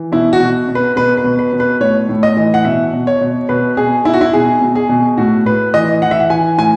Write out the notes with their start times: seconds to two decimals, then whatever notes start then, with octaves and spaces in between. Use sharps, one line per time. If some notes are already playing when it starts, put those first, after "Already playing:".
Already playing: E3
0.12 B2 E4
0.33 F#4
0.40 B2
0.68 B2
0.75 B4
0.96 B2 B4
1.17 B4
1.24 B2
1.39 B4
1.53 B2
1.60 B4
1.80 A2 C#5
2.09 A2
2.23 D#5
2.37 E3
2.54 F#5
2.65 B2 E5
2.93 B2
3.07 C#5
3.21 B2
3.49 B2 B4
3.77 B2 G#4
4.05 B2 E4
4.14 F#4
4.21 E4
4.34 B2 G#4
4.61 B2
4.75 G#4
4.89 B2
5.18 A2 F#4
5.46 A2 B4
5.74 E3 D#5
6.02 E3 F#5
6.11 E5
6.20 F#5
6.30 E3 G#5
6.58 A2 G#5